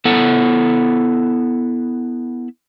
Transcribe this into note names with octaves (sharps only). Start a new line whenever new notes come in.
B3 E4 A4 F#5